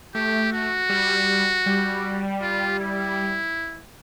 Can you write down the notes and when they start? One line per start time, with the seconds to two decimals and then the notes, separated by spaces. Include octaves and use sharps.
0.15 A3 G4
0.53 F#4
0.89 G3
1.66 G3
2.41 F4
2.79 E4